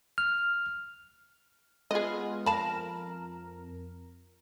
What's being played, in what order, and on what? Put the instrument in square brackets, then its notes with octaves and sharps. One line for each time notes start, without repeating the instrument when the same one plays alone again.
[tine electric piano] F6
[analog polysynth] G#3 B3 F4 [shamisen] G#4 D#5
[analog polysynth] F2 A#4 [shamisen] F5 A5 B5